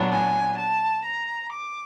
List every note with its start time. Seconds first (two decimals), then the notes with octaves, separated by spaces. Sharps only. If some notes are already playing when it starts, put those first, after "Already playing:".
Already playing: A#2 F#3 B3 D4
0.11 G#5
0.59 A5
1.05 A#5
1.52 D6